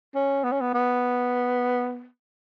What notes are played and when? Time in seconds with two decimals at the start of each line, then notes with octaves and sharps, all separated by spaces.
0.15 C#4
0.44 B3
0.52 C#4
0.61 B3
0.74 B3